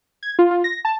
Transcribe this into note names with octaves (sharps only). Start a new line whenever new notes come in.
G#6
F4
F4
A#6
A5